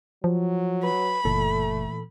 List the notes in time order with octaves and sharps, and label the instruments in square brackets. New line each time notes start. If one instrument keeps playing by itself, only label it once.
[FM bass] F3 [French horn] F#3
[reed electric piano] B4 [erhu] B5
[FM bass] F#1 [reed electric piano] A#2 E3 A4 [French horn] A3